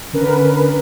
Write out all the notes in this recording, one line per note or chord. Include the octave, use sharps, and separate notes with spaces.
D3 C#4 A#4 B4